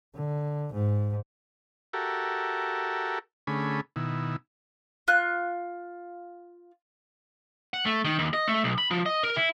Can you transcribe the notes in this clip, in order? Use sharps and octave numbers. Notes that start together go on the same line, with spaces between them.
D3
G#2
F#4 G4 A4 A#4 E5
D3 A3 C#4 G#4 B5
B2 D#3 E4
F4 F#6
F#5
A3
D#3
D#2
D#5
A3
B1
B5
F3
D#5
A#4
E4